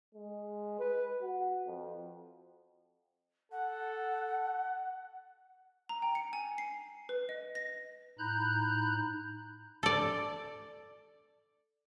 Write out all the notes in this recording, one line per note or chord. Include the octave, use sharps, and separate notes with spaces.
G#3
B4
F#4
F2
A4 F#5
A#5
G5
C#7
G#5
C7
B4
D#5
A#6
A2 D#4 A#5 B5 F#6 G6
A4 D5